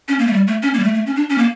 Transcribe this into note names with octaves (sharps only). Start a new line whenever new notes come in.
C#4
A#3
A3
G3
A3
C#4
A#3
G3
A3
A3
C#4
D4
C#4
A#3